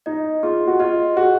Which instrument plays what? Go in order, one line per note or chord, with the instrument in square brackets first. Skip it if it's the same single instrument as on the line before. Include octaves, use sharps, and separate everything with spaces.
[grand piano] D#4 [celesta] D#5
[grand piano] F4 [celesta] G#4
[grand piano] F#4
[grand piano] F4 [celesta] D#5
[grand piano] F#4 [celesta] G#4